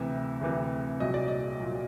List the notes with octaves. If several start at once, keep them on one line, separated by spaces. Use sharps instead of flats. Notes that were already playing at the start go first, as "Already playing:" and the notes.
Already playing: D2 C3 E3 E5
D2 C3 E3
C2 A#2 F#3 D#5
D5
D#5
A#2 F#3